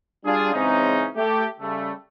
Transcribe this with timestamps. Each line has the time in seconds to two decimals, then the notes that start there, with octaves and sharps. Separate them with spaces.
0.25 G3 D4 F4 G#4
0.53 C#3 E3 G#3 C4 C#4 D#4
1.16 A3 G4
1.61 C#3 G3 A3